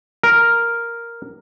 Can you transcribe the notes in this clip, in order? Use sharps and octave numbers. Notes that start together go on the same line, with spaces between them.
A#4